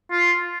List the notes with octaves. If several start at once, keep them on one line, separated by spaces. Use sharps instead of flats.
F4